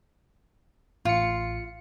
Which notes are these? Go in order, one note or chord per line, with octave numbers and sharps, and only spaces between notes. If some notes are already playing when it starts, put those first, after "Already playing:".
A1 F4 C#7